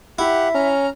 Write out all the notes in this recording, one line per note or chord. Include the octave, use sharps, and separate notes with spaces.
E4 G4 E5 F#5
C#4 A#5 F6